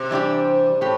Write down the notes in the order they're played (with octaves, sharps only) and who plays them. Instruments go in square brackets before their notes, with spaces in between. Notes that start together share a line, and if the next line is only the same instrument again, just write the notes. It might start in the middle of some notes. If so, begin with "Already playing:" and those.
Already playing: [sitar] C3
[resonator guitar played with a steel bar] E3 G3 D4 G4
[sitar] A2 [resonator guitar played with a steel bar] G4